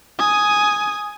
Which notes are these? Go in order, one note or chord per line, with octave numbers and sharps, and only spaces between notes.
G#5 D#6